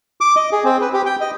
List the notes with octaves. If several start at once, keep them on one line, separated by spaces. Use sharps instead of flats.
D6
D#5
G#4
C4
B4
G4
G5
D#5